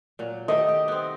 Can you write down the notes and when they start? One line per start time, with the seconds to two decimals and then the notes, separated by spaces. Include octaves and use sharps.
0.19 A#2 F#3
0.48 D#3 A3 G4 D#5
0.69 G4
0.88 B3 C4